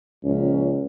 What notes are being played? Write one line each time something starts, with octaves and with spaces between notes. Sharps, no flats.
C#2 A#2 F3 C#4